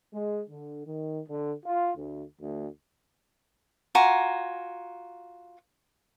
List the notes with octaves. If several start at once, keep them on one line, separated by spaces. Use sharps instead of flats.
G#3
D3
D#3
D3
F4
D2
D2
F4 F#4 G#5 A#5